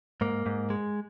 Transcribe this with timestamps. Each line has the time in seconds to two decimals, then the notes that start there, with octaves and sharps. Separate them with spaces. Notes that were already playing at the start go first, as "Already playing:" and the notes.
0.21 G#2 A#3
0.46 G#2
0.70 G#3